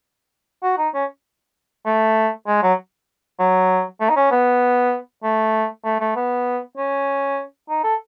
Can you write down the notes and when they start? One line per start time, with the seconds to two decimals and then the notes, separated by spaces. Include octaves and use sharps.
0.63 F#4
0.78 D#4
0.94 C#4
1.86 A3
2.47 G#3
2.63 F#3
3.39 F#3
4.01 A3
4.10 D#4
4.16 C#4
4.31 B3
5.23 A3
5.85 A3
6.00 A3
6.16 B3
6.77 C#4
7.69 D#4
7.84 A4